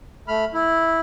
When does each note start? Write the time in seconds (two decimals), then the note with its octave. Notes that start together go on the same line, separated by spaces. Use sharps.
0.28 A3 B5 F6
0.54 E4